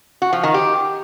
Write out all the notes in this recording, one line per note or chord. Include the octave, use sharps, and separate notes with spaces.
F#4
F3
D#3
G4